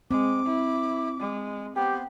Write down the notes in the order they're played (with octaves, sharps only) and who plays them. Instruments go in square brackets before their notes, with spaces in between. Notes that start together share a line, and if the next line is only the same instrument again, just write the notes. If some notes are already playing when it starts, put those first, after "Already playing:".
[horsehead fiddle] G#3 [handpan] C4 [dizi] D6
[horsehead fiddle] E4
G#3
[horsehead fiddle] B3 [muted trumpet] G4 [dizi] C5